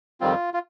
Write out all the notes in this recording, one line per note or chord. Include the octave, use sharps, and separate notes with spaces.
F2 D#3 G3 C4 F4
F4